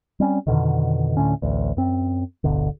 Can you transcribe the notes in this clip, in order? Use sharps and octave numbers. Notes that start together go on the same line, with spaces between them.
G3 C4 C#4
F2 B2 D3 D#3
D2 A2 D3 C#4
A1 D2
F#2 C4
D1 G1 B2 D3